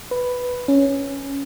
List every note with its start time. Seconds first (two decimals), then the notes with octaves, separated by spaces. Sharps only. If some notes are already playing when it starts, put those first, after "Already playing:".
0.11 B4
0.68 C#4